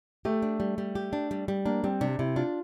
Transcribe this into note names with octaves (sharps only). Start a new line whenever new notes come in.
A3 G4
D4
G3
G3
G4
D4
G3
G3
A#3 D4
G3 C4
C3 D4
C3 E4
D4 F4